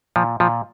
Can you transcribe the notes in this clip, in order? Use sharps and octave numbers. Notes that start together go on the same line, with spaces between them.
A#2 F3
A#2 F3